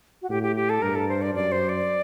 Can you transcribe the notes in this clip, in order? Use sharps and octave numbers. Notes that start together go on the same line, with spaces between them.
F#4
A2 G4
G4
G4
A4
G2 A#4
A4
C5
D5
F#2 D5
C5
D5